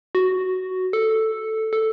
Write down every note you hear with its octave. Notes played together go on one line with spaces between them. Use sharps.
F#4
A4
A4